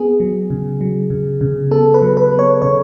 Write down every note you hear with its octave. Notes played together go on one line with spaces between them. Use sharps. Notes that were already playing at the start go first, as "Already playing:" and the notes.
Already playing: B3 G#4
F#3
C#3
F#3
C#3
C#3
B3 A4
B4
F#3
B4
B3
C#5
C#3 C#5